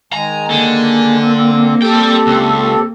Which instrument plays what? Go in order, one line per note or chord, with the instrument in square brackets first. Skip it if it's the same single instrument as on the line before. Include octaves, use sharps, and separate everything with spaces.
[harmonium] D#3 G#3 G#5 [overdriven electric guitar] A#5
[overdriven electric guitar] D3 [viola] A#3
[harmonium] C4
[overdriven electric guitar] G3 G5 [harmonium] C4 G4 A4
[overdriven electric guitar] C#2